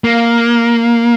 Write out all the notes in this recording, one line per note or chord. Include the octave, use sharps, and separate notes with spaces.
A#3